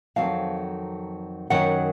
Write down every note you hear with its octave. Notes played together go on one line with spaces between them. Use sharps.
F2 D#3 F#3 C4 F5 A5
F#2 D#3 F#3 F#5